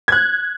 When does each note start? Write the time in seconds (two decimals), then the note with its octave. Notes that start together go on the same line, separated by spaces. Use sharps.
0.08 G#6
0.12 F#6